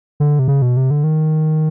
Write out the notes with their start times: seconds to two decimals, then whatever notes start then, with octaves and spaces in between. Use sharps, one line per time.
0.20 D3
0.39 C3
0.48 C#3
0.62 B2
0.77 C3
0.91 D3
1.04 D#3